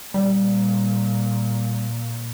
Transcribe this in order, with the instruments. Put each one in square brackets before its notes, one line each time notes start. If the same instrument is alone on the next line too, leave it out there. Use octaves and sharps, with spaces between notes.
[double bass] A#2 [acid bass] G3